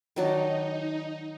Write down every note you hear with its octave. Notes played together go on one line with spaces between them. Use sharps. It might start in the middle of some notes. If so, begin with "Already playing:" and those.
D#3 F#3 D4 D#4